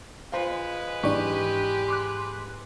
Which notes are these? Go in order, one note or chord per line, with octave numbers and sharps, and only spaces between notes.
G#3 F4 B4 C5 F5
G#2 E3 D4 G4 D5 C#6
C6 D6 F#6